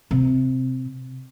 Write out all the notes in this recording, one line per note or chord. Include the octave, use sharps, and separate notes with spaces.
C3